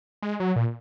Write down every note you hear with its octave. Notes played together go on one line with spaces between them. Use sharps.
G#3
F#3
A#2